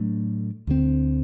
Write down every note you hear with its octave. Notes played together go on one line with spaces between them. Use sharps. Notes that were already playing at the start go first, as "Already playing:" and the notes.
Already playing: A2 F#3 A3 D4
D2 D3 F#3 C4